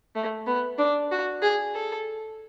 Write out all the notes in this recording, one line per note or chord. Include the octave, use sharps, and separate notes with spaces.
A3
B3
D4
F#4
G#4
A4